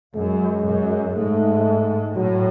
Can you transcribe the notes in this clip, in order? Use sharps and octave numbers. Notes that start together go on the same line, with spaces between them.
F#2 G#3
F#2
G#2 A3
A2 F#3